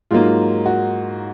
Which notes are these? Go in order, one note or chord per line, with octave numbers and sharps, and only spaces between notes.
G#2 F#3 A#3 F4
F#4